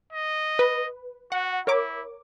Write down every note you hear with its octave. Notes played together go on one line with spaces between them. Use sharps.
D#5
B4
F#4 F#5
E4 A#4 C#5 D6